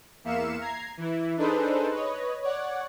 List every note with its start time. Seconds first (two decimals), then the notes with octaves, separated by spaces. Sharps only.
0.24 E2 A#3 E5 F5 C#7 E7
0.60 A#5 G#6 C7
0.97 E3 E4
1.37 D4 D#4 G#4 A4 B4 C5
1.92 B4 C#5 D#5
2.42 C#5 D5 F#5